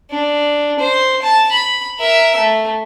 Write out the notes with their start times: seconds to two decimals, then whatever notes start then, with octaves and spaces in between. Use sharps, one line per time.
0.11 D4
0.79 C5
1.22 A5
1.51 B5
1.99 A#4 E5
2.36 A3